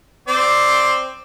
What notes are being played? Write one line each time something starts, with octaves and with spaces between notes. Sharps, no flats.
C4 D5